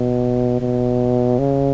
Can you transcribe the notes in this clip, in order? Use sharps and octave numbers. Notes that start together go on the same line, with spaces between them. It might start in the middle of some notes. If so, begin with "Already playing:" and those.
Already playing: B2
B2
C#3